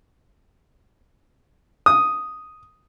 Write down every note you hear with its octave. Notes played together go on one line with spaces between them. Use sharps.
D#6